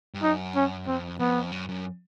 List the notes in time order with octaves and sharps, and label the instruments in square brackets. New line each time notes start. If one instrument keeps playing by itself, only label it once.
[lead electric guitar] G2
[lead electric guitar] F#2 [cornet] D#4
[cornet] C#4
[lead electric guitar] F2 [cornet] C4
[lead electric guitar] F2 [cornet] B3
[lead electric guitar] F#2
F#2